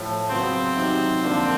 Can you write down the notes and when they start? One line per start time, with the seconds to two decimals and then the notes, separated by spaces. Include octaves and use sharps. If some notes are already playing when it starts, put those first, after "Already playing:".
Already playing: A2 F3 A3
0.28 C#3 F#3 B3 C4
0.76 C3 D#3 F#3
1.23 D3 F3 A#3 D4 F4